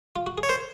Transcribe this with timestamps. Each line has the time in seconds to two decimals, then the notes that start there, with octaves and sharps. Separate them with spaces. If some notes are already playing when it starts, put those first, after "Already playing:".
0.16 F4
0.26 F#4
0.38 G#4
0.43 C#5
0.49 A#4 C5